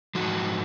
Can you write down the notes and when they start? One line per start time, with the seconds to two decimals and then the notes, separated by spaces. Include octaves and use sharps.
0.15 G#2 F3 D#4 F#4